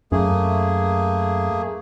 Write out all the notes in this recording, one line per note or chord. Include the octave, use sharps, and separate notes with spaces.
F#2 A3 A#3 G#4